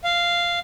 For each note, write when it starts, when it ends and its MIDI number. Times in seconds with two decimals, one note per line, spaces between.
0.04 0.59 77